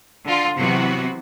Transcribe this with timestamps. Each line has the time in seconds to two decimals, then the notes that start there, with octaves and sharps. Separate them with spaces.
0.25 D3 F4
0.57 C3 E3 F#3 B3 F#4